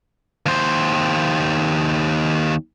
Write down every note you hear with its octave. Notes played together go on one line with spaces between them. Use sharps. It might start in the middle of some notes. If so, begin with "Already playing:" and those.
D#2 C5